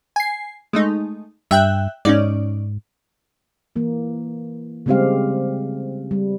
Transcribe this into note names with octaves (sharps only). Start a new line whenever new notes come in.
G#5 C7
G#3 A3 D#4
G2 E5 G5 F#6
G#2 C#4 D#4 D5
E3 A#3
C#3 G3 G#3 C4 G4 F5
G3